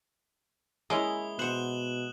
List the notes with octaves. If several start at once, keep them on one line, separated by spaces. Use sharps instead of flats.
G#3 A#3 C#4 E4 D#6 G7
B2 C5 F#5 F#6 E7 F#7